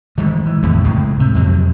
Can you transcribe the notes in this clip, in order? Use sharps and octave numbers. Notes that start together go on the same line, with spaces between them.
D#3 G#3 A3
E3
F2 A2 C3 A3
C#2 A2 G#3
C3
F2 C3 F#3